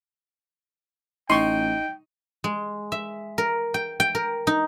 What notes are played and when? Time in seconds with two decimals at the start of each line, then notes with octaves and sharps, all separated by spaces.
1.30 A1 D#4 G5 C6 C#6
2.44 G#3
2.92 E5
3.38 A#4
3.74 G5
4.00 G5
4.15 A#4
4.47 D#4